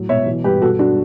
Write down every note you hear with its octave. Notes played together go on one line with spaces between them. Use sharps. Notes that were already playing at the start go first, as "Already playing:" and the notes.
Already playing: A2 F#3
B2 C#5 E5
E3
G2 G4 B4
B2 F#4 A4
D4 F#4